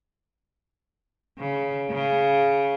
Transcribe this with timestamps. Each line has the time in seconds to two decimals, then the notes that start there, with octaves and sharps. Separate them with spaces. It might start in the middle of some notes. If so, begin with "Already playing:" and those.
1.38 C#3
1.90 C#3